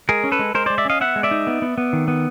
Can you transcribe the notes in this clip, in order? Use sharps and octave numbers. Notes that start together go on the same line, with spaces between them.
G#3 G#4 A#4
C#4
A4 B4
G#3
G#3 A#4 C5
G#3 C5 D5
D5 E5
C#4 D#5 F5
B3 E5 F#5
G#3
D5 E5
D#4
B3
B3
B3
D#3
B3